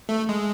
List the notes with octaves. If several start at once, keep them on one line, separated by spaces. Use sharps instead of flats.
A3
G#3